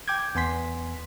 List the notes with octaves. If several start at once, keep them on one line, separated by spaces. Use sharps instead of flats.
G5 D6 G6 G#6
E2 B3 G#5 C6 B6